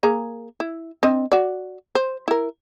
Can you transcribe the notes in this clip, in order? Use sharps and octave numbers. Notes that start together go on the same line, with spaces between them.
A#3 G#4 A#5
E4
C4 D4 D#5
F#4 D5
C5
E4 A#4